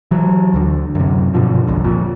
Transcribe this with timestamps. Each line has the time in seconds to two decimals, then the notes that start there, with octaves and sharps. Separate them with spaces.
0.11 E3 F#3
0.54 D2 D3
0.95 F#2 C3
1.34 G2 B2 D3 F3
1.67 G1 C2 F2
1.84 F2 A#2